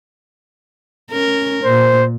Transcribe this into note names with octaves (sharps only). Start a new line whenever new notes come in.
C#4 A#4
A#2 C5